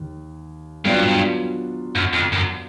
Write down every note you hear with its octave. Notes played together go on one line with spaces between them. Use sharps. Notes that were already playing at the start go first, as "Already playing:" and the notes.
Already playing: D#2
G2 F#3 B3 D4 F4
F#2
F2
F#2